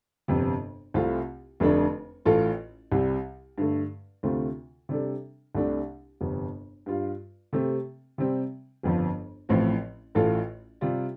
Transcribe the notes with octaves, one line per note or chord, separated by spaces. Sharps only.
G1 F2 C3
C2 C3 A3 C4 F4
F1 F2 D3 A3 D4
A1 A2 A3 F4 A4
C2 C3 G3
G2 D3 A3
D2 C3 A3 C4 F4
C3 G3 D4 A4
C2 C3 A3 D4 G4
G1 F2 C3
G2 G3 F4
C3 A3 C4 G4
C3 G3 C4
G1 F2 F3
A1 A2 F3 C4
A1 A2 A3 F4 A4
C3 G3 F4